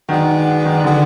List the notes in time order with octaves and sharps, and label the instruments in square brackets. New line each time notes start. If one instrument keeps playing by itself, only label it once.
[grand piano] D#3 [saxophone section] G#3 B3 D4 F#4
[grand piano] D#3
[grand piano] D3 [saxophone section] G#3 B3 D4 F#4